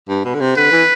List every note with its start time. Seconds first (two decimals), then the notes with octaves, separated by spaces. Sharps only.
0.09 G2
0.25 B2
0.34 D3
0.41 C3
0.57 D3 B4
0.72 E3